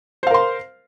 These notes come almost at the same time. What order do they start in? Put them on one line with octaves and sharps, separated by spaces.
C5 F5 A#4 C6